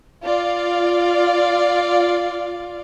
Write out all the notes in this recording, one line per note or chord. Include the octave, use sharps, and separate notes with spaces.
F4 D5 F5